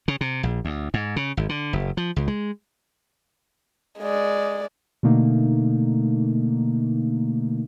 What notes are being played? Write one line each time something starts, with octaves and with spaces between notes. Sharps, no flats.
C#3
C3
A#1
D2
G#2
C#3
G#1
D3
F#1
F3
C#2
G#3
G#3 D5
B2 D3 A3 A#3 D#4